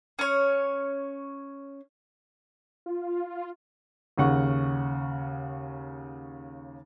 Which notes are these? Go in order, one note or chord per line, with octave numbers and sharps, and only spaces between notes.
C#4 C#5
F4
D#2 C#3 F#5 C#6